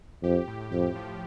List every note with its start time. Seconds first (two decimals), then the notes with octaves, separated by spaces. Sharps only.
0.23 F2 G4
0.48 A2
0.72 F2 G4
0.96 F3